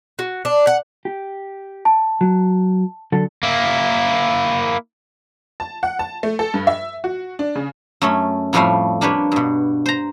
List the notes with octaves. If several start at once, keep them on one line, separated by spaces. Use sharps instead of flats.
F#4
D4
F#5
G4
A5
F#3
D3 F#3 A4
A#3 E4
A5
F#5
A5
A3
A4
G2
E5
F#4
D4
C#3
F#2 A3 C#4
F2 A2 F3 G3 A3 F5
A#3 D4 G4 B4 C#5
G2 B2
C5 A#5